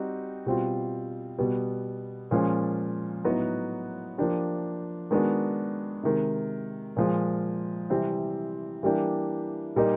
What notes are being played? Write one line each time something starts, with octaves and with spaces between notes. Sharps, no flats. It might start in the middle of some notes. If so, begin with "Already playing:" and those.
Already playing: G3 C4 D#4 F#4
B2 G3 C4 F4
B2 G3 B3
A#2 F3 G#3 C#4
A2 F#3 B3 D#4 F#4
F3 A#3 D4 G4
D#3 G#3 B3 D4 F#4
C3 D#3 G#3
A#2 F3 G#3
C3 E3 G3 C4
E3 G3 A#3 D4 G4
A#2 G3 A#3 D#4